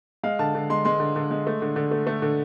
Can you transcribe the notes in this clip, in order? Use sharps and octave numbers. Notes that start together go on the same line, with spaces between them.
G#3 F5
D3 A5
D3
G#3 C6
G#3 C6
D3
D3
G#3
A3
D3
D3
A3
A3
D3